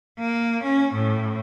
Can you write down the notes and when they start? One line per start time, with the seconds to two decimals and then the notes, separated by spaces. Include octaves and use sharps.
0.19 A#3
0.63 C#4
0.94 A2